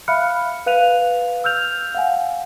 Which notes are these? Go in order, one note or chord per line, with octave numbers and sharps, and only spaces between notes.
E5 F5 B5 F6 F#6 C#7
B4 F5 F#6 D#7 F7
E6 F6 G6 F7
F5 F#5 G#5